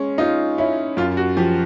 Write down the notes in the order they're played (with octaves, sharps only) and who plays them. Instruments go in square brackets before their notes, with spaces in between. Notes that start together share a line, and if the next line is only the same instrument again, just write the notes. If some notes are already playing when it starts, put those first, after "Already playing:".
Already playing: [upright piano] G#3 C#4
[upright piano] D#4 [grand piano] F4
[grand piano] C#4 [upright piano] E4
[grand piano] F#2 [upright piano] F4
[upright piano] F#4
[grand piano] F3 [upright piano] G4